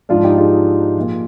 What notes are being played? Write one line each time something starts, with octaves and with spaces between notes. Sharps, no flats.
G#2 F3 D4 F4
D#4 G4
F4 G#4
A#2 F3